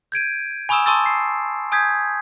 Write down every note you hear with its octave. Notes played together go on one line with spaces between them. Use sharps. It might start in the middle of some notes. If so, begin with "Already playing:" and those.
G6 G#6 D7 D#7
G#5 B5 C#6 D#6 E6 E7
A5 C6 C#6 D#6 E6 A6
C7
G#5 D#6 G6 G#6 B6